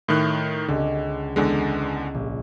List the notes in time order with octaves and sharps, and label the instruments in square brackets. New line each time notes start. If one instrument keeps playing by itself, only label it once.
[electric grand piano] A2 D#3 F#6
[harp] C#2 [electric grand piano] D3
[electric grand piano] E2 D3 G#3
[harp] A#1